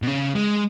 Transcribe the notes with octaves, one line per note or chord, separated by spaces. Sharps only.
B2
C#3
G#3